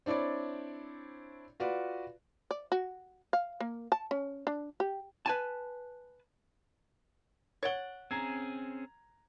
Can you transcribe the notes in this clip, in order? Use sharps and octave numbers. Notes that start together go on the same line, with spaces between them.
C4 D4 E4 C#5 D5
F4 F#4 B4 D5
D5
F#4
F5
A#3
A5
C#4
D4
G4
B4 G#5 A5
C#5 F#5 A6 D7 G7
C4 C#4 G#4 A#5 G#6